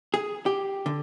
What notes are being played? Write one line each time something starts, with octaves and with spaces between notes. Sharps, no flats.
G#4
G4
D3